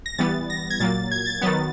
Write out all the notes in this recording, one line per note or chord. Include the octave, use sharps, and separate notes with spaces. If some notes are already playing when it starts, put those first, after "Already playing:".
A#6
E3 G3 B3 A6
A#6
G#6
A#2 F#3 A#3 A6
G#6
G#6
A6
D#3 F#3 B3 A6